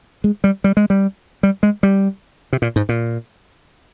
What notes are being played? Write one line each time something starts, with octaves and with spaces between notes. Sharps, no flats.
G#3
G3
G3
G#3
G3
G3
G#3
G3
C3
A#2
G#2
A#2